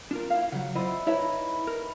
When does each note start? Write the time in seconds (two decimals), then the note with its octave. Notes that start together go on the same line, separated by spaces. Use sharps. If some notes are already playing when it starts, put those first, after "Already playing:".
0.11 D4 F4 A#4
0.30 E4 F5
0.52 C#3 F#3 F#5
0.75 E4 F4 C5 D5 D#5
1.07 D#4 E4 B4 C#5 D#5 E5 A#5
1.67 A#4